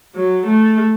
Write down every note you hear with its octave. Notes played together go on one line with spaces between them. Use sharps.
F#3
A3